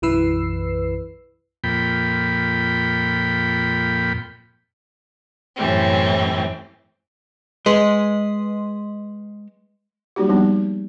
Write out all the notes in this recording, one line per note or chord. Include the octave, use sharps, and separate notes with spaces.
B1 F#2 E3 B4 E6 C7
F2 A#2 G5 B5
F#2 A2 E3 G3 C4
G#3 B4 D#5 C6
F#3 G3 A#3 D#4 F#4 G4
F3 G3 B3 D4 D#4